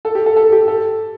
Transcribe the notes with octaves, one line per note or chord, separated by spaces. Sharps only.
A4
G4
A4
A4
G4
A4